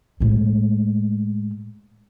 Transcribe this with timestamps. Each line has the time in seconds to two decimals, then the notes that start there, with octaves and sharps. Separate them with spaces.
0.20 A2 G#3